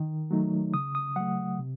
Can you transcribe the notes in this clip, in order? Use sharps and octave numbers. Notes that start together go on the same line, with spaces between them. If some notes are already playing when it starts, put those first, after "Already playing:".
Already playing: D#3
F#3 A3 D#4
C#3 D#6
D#6
F#3 A3 F#5
C3